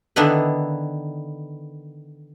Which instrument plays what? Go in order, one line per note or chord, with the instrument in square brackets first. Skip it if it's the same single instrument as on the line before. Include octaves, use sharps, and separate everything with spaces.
[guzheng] D3 D#3 B3 D4 E4 B4